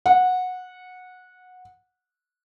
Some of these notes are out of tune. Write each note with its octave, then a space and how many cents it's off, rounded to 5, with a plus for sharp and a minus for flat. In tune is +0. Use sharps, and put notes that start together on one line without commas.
F#5 -15